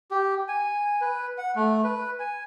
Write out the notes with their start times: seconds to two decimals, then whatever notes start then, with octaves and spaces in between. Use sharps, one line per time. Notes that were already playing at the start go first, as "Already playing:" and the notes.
0.11 G4
0.48 G#5
1.01 B4
1.38 F#5
1.56 A3
1.84 B4
2.19 G#5